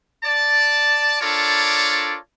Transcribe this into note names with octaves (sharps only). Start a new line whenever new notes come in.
D5 A5
D4 F4 A4 A#4 C#5 D5